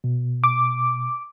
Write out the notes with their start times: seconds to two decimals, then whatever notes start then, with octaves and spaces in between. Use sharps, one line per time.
0.04 B2
0.44 D6